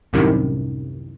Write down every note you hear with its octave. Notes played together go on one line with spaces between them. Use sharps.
C2 F#2 A2 C3 D#3